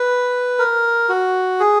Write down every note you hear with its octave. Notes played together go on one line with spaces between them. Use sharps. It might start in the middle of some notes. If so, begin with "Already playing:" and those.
Already playing: B4
A#4
F#4
G#4